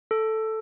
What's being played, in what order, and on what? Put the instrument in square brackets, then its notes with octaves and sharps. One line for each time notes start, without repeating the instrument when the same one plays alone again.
[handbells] A4